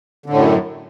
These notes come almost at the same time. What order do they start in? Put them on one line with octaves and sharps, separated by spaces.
D3 A2 F#2